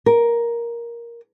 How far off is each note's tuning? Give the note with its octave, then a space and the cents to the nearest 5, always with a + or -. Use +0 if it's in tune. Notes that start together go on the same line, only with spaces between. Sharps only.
A#4 +10